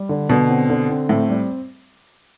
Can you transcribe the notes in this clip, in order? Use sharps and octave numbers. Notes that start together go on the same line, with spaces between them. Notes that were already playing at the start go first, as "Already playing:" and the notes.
Already playing: G3
D3
B2 D3
C4
D3
C4
A2 C4
G3